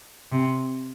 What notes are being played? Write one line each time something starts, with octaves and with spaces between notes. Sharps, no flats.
C3